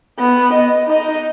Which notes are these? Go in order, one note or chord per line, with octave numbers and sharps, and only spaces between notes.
B3
D#5
D#4 D#5